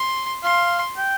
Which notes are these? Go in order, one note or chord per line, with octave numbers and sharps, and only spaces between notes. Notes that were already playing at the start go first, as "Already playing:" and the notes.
Already playing: C6
F5 C6
G5